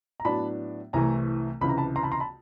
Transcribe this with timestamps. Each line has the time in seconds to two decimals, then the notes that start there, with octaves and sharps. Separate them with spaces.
0.20 A#5
0.25 A2 F#3 B3 D4 A5 B5
0.93 C2 C3 E3 A3 G#5 A#5
1.61 C#2 C3 E3 B5
1.69 A#5
1.77 A5 B5
1.96 A#5 C6
2.03 A5 B5
2.12 A#5 C6
2.20 A5 B5